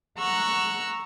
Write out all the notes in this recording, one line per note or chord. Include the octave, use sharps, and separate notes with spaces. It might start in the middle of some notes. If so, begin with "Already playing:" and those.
F#5 A#5 C#6 E6 F#6